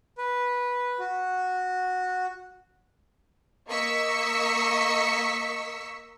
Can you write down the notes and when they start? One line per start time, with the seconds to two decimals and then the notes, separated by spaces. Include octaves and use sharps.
0.18 B4
0.99 F#4
3.68 A#3 D#5 C#6 E6 B6 C#7